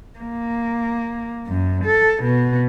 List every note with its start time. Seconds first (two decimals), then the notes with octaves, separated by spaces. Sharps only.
0.20 A#3
1.48 F#2
1.85 A4
2.24 B2